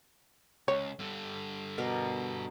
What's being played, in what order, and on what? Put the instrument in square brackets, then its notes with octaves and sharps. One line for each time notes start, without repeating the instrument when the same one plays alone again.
[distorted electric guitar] C#2 [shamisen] C#5
[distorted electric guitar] G2 D3
[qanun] B2 A#4 D5